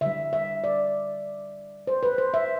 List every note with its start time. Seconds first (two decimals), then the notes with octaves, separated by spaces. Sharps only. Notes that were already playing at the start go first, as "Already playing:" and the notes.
0.01 D3 G3 E5
0.33 E5
0.64 D5
1.87 C5
2.03 B4
2.18 C5
2.34 E5